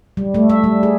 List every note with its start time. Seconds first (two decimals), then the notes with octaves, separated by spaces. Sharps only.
0.17 G3
0.34 A3
0.50 E5
0.64 G3
0.83 G#4